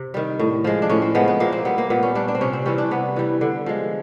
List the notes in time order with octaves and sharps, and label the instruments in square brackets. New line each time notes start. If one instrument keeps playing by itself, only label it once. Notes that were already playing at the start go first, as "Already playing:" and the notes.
Already playing: [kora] C3
D#3 G3
A2
F3 G#3
D4
A2 C#4
C4
F3 G#3 B3
B3
A#2 A#3
C4
G3 B3
A#3
A#2 B3
C#4
G3 D4
D4
C4
C3 C#4
C4
E3 G3 C#4
D4
C3 B3
E3 G3
D3
F3 G#3